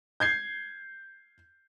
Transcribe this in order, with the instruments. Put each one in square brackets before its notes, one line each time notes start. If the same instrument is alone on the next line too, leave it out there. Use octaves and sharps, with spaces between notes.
[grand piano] G6 G#6 C7